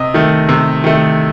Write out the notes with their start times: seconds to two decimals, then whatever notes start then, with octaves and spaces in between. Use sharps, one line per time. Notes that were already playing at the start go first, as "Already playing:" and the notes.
Already playing: C3 D#5
0.14 D#3 A3
0.49 C3
0.84 D#3 A3